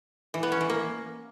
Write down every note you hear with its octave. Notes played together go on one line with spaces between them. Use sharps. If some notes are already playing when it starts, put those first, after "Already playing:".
E3
B3
C#4
E3
A#3